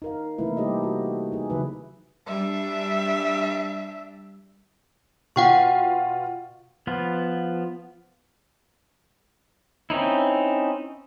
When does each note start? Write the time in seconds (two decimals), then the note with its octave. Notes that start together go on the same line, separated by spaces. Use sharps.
0.02 D#4 A#4 F5
0.38 C3 E3 A3 A#3 E4 B4
0.57 G3 D#4 G4 A4 C5 D#5
0.83 F#4
1.32 D#4 G#4
1.50 C#3 E3 F#3 D#4 B4 E5
2.27 G3 D4 E5
5.36 B2 F4 F#5 G5 C#6
6.87 F3 B3 F4
9.90 C4 C#4 D#4 E4